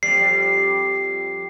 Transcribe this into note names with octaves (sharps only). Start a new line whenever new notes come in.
F2 G3 C7